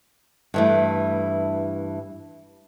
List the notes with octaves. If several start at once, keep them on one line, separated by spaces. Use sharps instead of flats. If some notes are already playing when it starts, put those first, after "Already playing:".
G2 E3 A3